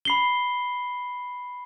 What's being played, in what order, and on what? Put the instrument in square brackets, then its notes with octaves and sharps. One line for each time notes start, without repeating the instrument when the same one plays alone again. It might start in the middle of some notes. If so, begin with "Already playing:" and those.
[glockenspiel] B5 C7 G7